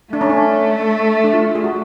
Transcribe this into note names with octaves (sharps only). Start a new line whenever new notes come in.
A3 D4
C#4
D4
D4
F4
G#4
F#4